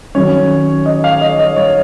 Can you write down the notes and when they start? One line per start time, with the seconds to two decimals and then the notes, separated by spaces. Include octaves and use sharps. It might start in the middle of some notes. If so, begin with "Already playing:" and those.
0.15 D#3 F#3 C#4 C#5
0.86 D#5
1.04 F5
1.21 D#5
1.39 D#5
1.56 C#5